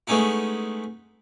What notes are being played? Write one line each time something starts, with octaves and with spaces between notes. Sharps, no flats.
G#3 A3 B3 C#4 D#4 E4